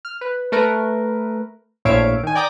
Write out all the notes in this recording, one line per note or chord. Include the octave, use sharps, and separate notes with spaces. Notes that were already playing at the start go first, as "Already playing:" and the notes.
F6
B4
A3 A#4 B4
A#1 A2 C#5 E5 F5 D7
D#3 G#5
D5 G5 A#5 D6 D#6